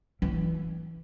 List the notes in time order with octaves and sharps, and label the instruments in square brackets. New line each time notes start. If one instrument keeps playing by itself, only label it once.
[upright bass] E3